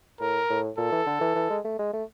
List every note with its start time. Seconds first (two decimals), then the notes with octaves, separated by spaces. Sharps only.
0.20 A2 A#4
0.50 A2
0.78 A#2 A4
0.92 E3
1.06 D3
1.21 E3
1.35 E3
1.50 G#3
1.65 A3
1.79 G#3
1.93 A3